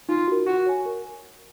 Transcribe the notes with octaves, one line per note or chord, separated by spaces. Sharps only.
D#4 F4
F#4 A#4
F#4 A#4
C#5 G#5
A#4